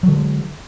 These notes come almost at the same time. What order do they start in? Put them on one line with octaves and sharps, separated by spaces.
F#3 D3 G#3